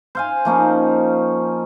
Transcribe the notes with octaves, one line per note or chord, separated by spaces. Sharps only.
C5 F5 G#5
F3 A#3 C#4 D#4